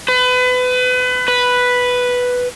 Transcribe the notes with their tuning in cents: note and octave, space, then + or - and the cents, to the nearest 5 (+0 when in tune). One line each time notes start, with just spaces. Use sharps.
B4 +30
B4 +0